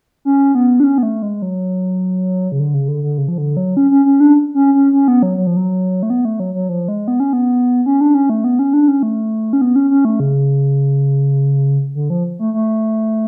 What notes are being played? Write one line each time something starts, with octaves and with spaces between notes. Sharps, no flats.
C#4
B3
D4
C#4
B3
A3
G#3
F#3
C#3
D3
C#3
D3
D3
C#3
F3
D3
F#3
C#4
C#4
C#4
D4
C#4
C#4
C#4
B3
F#3
F#3
F3
F#3
A3
B3
A3
F#3
F#3
F3
G#3
B3
C#4
B3
C#4
D4
C#4
A3
B3
C#4
D4
C#4
A3
C#4
B3
C#4
C#4
A3
C#3
D3
F3
A3
A3